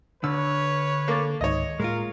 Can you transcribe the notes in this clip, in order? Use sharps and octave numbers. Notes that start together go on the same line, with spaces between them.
D3 B4 C#5 E6 F6
A#3 A4 D6 A6
C#2 G#2 D#3 C#5 D#5
A2 G#3 A#3 F4 A#4